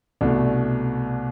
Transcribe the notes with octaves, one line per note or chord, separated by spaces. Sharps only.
C2 B2 A3 D4